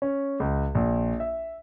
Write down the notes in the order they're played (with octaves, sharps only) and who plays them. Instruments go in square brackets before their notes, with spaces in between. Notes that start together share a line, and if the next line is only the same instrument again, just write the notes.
[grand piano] C#4
C#2
A#1
E5